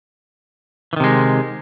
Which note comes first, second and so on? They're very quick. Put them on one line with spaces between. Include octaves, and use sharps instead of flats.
E3 D#3 C3 G#3